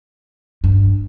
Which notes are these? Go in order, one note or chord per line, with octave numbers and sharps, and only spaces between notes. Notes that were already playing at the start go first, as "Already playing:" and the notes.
G2